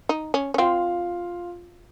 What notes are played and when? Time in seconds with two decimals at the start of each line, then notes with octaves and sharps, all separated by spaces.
0.09 D#4
0.34 C#4
0.54 C#4
0.58 C4 F4 F5